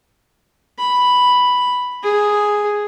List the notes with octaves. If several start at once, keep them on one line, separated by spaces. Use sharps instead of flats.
B5
G#4